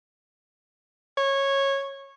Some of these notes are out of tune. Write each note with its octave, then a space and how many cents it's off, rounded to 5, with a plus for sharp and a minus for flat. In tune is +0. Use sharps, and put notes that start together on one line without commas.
C#5 -15